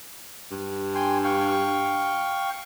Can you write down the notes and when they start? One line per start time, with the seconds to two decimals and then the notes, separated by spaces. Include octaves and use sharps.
0.51 G2
0.95 G5 G#5 C6
1.24 F5 G5 C#6